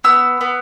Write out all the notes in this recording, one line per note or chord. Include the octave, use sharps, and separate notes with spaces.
B3 E6
B3